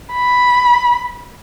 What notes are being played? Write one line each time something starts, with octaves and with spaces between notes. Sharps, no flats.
B5